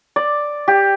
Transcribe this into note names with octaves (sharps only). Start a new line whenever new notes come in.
D5
G4